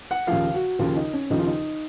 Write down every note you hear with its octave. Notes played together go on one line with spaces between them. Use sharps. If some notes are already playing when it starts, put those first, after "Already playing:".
F#5
D#2 C#3 F3 F5
F#4
D#2 C#3 F3 F4
D#4
C#4
D#2 C#3 F3 D#4
F4
D#4